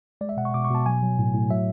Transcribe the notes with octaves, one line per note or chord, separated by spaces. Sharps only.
G#3 D5
E5
B2 F#5
C#6
B2 D6
C#6
B2 A5
F#3 G#5
F#3
A2
A2
F#3 E5